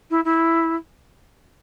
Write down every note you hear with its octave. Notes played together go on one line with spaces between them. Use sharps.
E4
E4